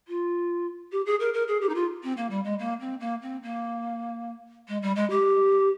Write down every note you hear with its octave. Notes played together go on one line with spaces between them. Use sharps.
F4
G4
G#4
A#4
A#4
G#4
G4
D#4
F4
C4
A#3
G3
G#3
A#3
C4
A#3
C4
A#3
G#3
G3
G#3
G4